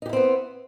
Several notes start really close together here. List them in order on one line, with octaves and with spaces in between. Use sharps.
D#4 G4 E4 C4 B3